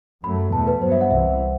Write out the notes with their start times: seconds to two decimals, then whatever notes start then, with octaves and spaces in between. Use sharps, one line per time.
0.23 F#2 F#3 A3 B5
0.52 E2 B2 A3 A5
0.67 B4
0.82 G2 F#3 B3 C5
0.92 E5
1.01 F#5
1.11 C2 C3 E3 E5